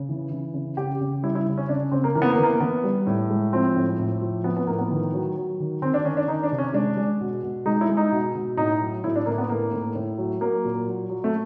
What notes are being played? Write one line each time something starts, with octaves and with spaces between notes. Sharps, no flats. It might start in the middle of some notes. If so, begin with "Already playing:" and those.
Already playing: C#3
E3
E3
C#3
C#3 G4
C#3
G3 E4
E4
C#3
C#4
C#3 D4
C#3 C4
A#3
E3 A#3
B3
A#3
E3 B3
A#3
E3 B3
G3
A2
G#3
F3 C4
A2
A2
F3
F3 B3
B3
A2 A#3
B3
D#3
F#3
F#3
D#3
D#3 C4
D4
D#3 C#4
D4
D#3 D#4
D4
C3
C#4
G#3 D4
G#3
B2
B2
G#3 D#4
E4
G#3
D#4
B2
B2
A2 D#4
F#3
A2 E4
D4
A2 A#3
B3
A2 A#3
A2
A2
F#3
F#3 A#3
A#2
F#3
F#3
A3